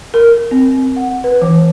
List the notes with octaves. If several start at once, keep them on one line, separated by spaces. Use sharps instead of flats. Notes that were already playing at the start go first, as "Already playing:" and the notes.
A#4
C4
F#5
B4
E3